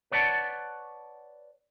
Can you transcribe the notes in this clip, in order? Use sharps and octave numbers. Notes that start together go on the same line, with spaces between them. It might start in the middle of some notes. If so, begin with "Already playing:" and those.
B4 C#5 D5 F#5 A5